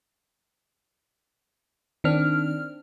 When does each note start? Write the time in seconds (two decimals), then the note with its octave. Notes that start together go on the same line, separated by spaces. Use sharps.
2.04 D#3 C4 D4 F6